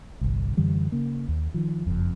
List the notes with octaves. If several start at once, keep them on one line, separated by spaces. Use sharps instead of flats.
G1 C2
F#2 D3 E3 G3
C#3 A#3
D#2
D#3 F3
F#1 F2